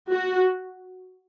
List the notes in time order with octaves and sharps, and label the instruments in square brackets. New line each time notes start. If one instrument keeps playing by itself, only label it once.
[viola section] F#4